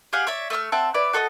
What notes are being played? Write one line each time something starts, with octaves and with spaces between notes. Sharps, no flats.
G4 G#4 F5 F#5
C#5 D5 E5
A3 E5 E6 F6
C4 E5 F#5 A5
E4 B4 D5
F#4 A4 D5 D#5